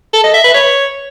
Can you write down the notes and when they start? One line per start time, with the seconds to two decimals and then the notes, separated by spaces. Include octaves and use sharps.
0.14 A4
0.24 D#5
0.34 E5
0.44 B4
0.54 C#5